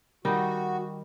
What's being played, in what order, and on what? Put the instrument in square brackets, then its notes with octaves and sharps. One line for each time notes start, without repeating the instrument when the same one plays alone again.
[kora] D#3 G3 D#4 [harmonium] F#4